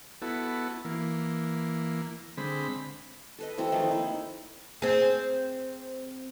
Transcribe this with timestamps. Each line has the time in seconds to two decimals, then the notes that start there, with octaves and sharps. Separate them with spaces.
0.22 B3 E4 F#4 A4
0.85 E3 A#3
2.37 D3 G#3 C4 B5
3.39 A4 B4 D#5
3.58 E3 C4 F#4 A4
3.72 D#3 F3 A3 D#4
3.91 A#3 D#4 E4
4.82 C4 G#4